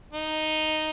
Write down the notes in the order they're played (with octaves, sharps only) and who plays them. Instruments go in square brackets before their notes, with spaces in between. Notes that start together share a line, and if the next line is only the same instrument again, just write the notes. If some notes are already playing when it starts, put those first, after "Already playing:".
[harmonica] D#4